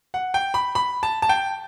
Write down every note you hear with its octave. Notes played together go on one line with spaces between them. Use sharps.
F#5
G5
B5
B5
A5
A5
G5